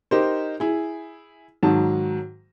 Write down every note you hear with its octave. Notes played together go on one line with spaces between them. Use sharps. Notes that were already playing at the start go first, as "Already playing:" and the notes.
D#4 G4 A#4 C5
E4 G#4
G#2 D#3 F#3 A5